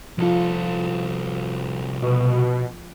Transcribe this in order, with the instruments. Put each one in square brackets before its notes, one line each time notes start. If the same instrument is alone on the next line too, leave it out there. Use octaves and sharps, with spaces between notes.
[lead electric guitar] C2 A4 [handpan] F3 F4
[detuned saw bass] B2